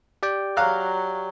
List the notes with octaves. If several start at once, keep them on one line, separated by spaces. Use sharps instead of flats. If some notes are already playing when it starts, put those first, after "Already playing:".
G4 D5 G5
F#3 F5 A#5 F#6